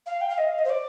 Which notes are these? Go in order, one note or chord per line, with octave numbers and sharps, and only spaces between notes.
F5
G5
F5
D#5
F5
D#5
C5
D5